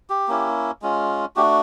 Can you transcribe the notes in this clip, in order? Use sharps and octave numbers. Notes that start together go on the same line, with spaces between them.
G4
A#3 C#4 E4
G#3 C#4 F4
A3 D4 F#4 G4